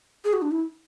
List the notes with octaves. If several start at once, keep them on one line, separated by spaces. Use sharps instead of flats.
G#4
F#4
D4
E4